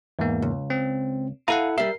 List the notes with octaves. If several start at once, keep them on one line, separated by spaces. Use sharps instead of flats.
E2 G#2 A#3
C#2
C4
E4 A4 F5 F#5 A#5
G3 A#4 E5 C7